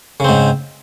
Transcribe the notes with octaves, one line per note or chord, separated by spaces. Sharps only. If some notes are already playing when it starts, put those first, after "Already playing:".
G#2 C#3 C4